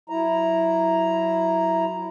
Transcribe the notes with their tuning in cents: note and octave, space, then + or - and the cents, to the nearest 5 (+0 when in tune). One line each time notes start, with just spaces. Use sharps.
F#3 +0 E4 +0 A#5 +0